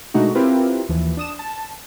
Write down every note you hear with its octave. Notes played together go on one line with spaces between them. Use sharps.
B2 G#3 A3 D4 D#4 F#4
C4 E4 F4 G4 A#4 B4
D#2 E3 F3
D4 D#6 E7
A5